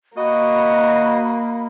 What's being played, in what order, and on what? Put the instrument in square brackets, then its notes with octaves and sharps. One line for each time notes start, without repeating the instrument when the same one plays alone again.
[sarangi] A#3 [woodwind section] F#4 [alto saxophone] D#5 [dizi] B5